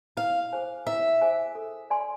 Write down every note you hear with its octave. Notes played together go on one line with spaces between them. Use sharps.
E4 F5
G#4 C5 G#5
E4 E5
G#4 C5 G#5
A4
D5 G#5 C6